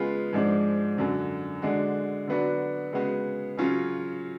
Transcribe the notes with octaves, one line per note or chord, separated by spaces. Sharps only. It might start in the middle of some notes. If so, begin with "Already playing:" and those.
Already playing: C#3 G#3 B3 F4
G#2 F3 G#3 D4
F#2 D3 F#3
D3 G#3 D4 F#4
D3 F#3 B3 D4 F#4
C#3 G#3 B3 F#4
C#3 F#3 C#4 F4